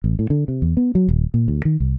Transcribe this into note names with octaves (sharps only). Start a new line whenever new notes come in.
A1
A2
D3
C3
E2
B3
F#3
D#1
A#2
D2
D#3
C2